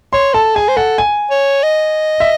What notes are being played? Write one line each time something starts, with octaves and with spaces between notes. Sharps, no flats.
C#5 C6
A4 A5
G#4 G#5
C5
A4 F#5
G#5
C#5
D#5
E5